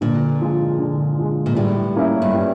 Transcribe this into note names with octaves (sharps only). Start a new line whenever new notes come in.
A#2 D3
F3 G#3
D3
F3 G#3
A#2
A2 G3
A#3 C#4 E4
G2
G3